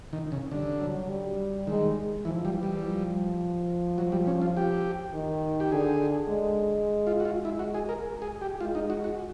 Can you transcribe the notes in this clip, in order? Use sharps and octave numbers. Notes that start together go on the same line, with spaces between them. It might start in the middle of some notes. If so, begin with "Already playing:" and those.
D#3
C#3
D3 G3
F#3
G3
D#3 G#3
E3 F3
G3
E3
G3
F3
F#3
G3
C#4
F4
G4
D#3
G4
D3 G#4
G#3
F4
F#4
F4
G#3 E4
F#4
G#4
A#4
G#4
G4
G#3 F4
D#4
F#4
F#4